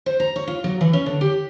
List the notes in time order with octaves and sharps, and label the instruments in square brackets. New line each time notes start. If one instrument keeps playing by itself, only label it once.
[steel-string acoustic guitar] C5
A#5
C#5
F4
F#3
E3
C#4
D3
G4